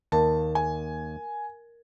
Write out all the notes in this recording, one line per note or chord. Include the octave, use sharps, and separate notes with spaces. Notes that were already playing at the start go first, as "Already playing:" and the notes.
D#2 A#4 A5
G#5